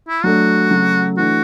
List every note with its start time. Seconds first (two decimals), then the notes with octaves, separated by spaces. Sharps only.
0.08 E4
0.24 F#3 A3 D4 F#4
0.70 C#3 F#3 A3
1.17 E3 A3 D4 F#4